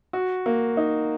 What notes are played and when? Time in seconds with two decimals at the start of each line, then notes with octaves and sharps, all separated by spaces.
0.13 F#4
0.46 A#3
0.77 D#4